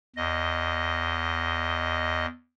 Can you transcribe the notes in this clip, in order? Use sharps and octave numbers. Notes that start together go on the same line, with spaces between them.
E2 D#5